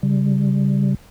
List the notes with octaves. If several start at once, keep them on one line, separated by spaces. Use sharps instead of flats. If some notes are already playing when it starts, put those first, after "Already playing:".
C#3 G3